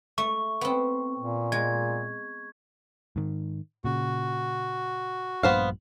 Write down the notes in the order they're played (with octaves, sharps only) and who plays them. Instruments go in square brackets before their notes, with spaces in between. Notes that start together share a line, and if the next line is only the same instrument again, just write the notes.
[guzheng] A3 [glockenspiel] C#6
[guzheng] B3 C4
[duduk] A#2
[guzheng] G#3 [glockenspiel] G#6
[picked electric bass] G#2 D#3
[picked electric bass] A#2 C#3 [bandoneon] F#4
[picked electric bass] A#1 G2 A#2 [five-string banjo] B3 C5 F5